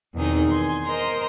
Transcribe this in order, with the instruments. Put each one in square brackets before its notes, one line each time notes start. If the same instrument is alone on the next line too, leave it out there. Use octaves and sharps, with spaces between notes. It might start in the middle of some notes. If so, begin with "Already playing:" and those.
[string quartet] E2 B2 D#3 C4 D#4 G#4
G#5 C6
A#4 C5 D#5 A#5 C6